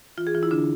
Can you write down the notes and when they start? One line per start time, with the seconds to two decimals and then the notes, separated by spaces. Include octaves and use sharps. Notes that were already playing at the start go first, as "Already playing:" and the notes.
0.18 E3 F4
0.27 G#4
0.35 E3 F4
0.43 E4
0.51 D3 D4